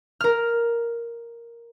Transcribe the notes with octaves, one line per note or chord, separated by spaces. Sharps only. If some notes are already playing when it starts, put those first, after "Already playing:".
A#4 F6